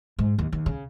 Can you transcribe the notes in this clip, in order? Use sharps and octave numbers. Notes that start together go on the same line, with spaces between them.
G#2
D#2
D#2
C#3